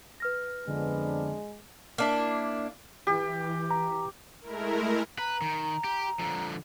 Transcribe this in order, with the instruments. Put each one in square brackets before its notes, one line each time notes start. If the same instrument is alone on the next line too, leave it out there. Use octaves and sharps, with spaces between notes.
[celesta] B4 F6 A#6
[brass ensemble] F2 B3 D4 [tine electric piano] D3 [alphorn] G#3
[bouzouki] A#3 D4 E4
[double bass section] E3 [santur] G4
[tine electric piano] A#5
[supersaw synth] G#3 A3 E4 A#4
[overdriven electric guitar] B4 [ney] A#5
[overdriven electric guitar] D#3
G4
D3 F3